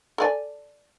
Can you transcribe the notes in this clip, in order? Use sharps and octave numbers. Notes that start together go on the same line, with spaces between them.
A4 D5 G#5